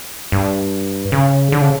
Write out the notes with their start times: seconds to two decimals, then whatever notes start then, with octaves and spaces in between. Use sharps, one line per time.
0.32 G2
1.12 C#3
1.52 D3
1.62 C#3